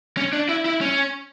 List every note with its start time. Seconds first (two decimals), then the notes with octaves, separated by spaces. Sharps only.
0.17 C#4
0.33 D4
0.49 E4
0.65 E4
0.81 C#4